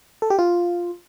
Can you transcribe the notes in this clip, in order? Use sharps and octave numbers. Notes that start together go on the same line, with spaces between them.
A4
G4
F4